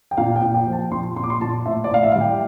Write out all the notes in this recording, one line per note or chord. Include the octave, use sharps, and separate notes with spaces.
G5
A#2 F5
G5
A#2
G5
F3
A5
A#2 C6
A#2 C6
D6
C6
A#2 A5
A2 E5
D5
A2 F5
E5
G3 F5
G5